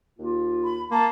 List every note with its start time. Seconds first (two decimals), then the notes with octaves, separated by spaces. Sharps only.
0.19 D#2 A#3 F4
0.64 B5
0.91 A#3 A5